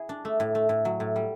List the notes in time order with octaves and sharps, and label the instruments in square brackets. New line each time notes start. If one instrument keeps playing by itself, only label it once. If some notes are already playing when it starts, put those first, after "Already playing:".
Already playing: [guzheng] E4 G#4
D4
A3
A2
A3
A2
F#3
A2
G3